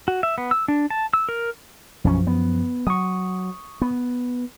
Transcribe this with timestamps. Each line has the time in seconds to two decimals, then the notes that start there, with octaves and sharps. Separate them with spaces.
0.08 F#4
0.23 E5
0.38 B3
0.51 E6
0.68 D4
0.90 A5
1.13 E6
1.29 A#4
2.04 B1 F#2 F3 C#4
2.27 B3
2.87 F#3 C#6 D#6
3.82 B3